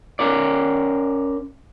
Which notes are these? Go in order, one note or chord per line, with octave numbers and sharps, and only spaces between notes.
C#4 A#4 D5